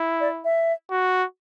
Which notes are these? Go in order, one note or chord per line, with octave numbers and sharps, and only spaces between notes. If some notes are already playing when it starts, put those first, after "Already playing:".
Already playing: E4
D5
E5
F#4